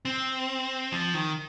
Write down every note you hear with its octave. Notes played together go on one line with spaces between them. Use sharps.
C4
F3
D#3